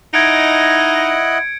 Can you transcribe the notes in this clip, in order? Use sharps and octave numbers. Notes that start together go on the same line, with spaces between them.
D#4 E4 D#5 F#5 G#6 C#7 D7